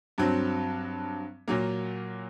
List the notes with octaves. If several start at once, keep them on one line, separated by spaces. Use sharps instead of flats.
G2 F#3 C4
A#2 F#3 A#3